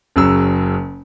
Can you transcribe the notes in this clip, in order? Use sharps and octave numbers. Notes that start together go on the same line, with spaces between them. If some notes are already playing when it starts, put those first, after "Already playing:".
F#1 C#3 F#3 E6